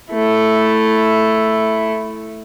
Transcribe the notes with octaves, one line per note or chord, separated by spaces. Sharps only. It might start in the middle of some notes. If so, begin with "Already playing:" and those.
A3 E4